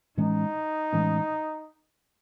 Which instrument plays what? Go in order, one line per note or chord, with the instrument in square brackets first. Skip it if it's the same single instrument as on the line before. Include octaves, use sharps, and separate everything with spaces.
[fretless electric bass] A2 E3 G#3 C#4 [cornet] D#4
[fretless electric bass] A2 E3 G#3 C#4